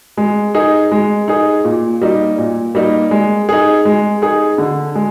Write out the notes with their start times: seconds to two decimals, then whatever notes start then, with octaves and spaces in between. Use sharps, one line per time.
0.17 G#3
0.55 D#4 G#4
0.92 G#3
1.28 D#4 G#4
1.64 A#2
2.01 G3 A#3 D#4
2.38 A#2
2.75 G3 A#3 D#4
3.11 G#3
3.49 D#4 G#4
3.85 G#3
4.22 D#4 G#4
4.58 D3
4.95 G#3